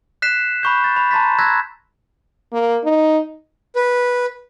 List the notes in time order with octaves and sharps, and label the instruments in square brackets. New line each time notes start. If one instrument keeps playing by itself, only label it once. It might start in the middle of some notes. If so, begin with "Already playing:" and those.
[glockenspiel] F#6 B6 C7 E7
B5 C#6 G6
A6
B5
A5 A#5 C6 A6 B6
E6 F#6 G#6 A#6 B6
[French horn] A#3
D#4
[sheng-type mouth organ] B4